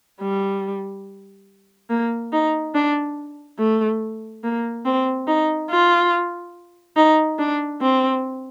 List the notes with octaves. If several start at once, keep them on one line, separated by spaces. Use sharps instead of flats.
G3
A#3
D#4
D4
A3
A#3
C4
D#4
F4
D#4
D4
C4